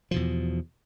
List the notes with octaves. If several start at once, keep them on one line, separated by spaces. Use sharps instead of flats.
E2 B2 F3